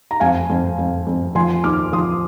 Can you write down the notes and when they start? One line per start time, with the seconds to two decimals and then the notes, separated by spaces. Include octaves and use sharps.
0.11 A#5
0.20 F2 F5 G#5
0.50 F2
0.79 F2
1.07 F2
1.35 F3 G#5 C6
1.64 D#2 D6 F6
1.92 F3 C6 D#6